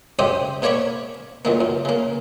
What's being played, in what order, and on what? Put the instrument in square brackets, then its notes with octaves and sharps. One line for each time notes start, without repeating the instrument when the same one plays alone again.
[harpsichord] F#2 C#3 G#3 G4 C5 D#6
G#2 A#3 C#5 D5 B5 C#6
C#2 D#3 A#3
F#2
C#3 A#3